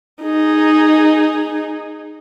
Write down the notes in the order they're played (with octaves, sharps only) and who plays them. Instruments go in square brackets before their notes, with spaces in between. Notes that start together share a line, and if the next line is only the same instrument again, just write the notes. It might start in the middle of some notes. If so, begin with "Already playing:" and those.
[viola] D#4 G#4